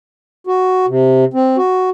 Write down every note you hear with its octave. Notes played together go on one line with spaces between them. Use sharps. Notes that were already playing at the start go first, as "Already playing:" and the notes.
F#4
C3
C4
F#4